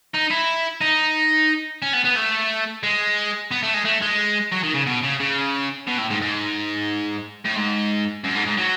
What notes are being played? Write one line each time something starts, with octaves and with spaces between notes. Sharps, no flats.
D#4
E4
D#4
C#4
B3
B3
A3
G#3
B3
A3
G#3
A3
G#3
F#3
D#3
C#3
B2
C#3
C#3
B2
A2
G#2
G#2
A2
G#2
F#2
G#2
G#2
F#3